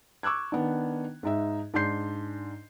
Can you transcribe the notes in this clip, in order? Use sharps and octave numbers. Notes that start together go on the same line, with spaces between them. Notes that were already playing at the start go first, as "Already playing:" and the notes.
C#6 D6 E6 F#6 G#6
D#3 B3 D4
G#2 D#4 E5
G#2 D4 D5 C6 G6 C7